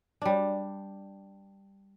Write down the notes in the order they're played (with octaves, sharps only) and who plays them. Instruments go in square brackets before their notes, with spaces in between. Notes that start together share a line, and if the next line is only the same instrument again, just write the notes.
[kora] G3 D4